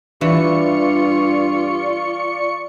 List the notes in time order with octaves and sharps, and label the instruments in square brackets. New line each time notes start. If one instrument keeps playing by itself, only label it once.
[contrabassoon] G2 [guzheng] E3 [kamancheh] F4 [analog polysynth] D5 C#6 C#7